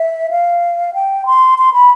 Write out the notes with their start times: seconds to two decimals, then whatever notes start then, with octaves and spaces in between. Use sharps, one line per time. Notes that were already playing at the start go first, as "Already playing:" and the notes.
Already playing: E5
0.30 F5
0.94 G5
1.26 C6
1.58 C6
1.73 B5